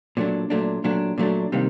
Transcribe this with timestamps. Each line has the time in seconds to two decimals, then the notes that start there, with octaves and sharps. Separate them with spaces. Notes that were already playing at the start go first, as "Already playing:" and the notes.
0.17 A#2 F#3 A3 D4
0.50 A#2 F#3 A3 D4
0.84 A#2 F#3 A3 D4
1.18 A#2 F#3 A3 D4
1.52 C3 D#3 G3 A#3